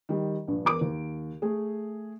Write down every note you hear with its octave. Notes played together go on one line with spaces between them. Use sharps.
D#3 G3
A#1 G2
E2 A#4 D6 D7
D#2
A3 G#4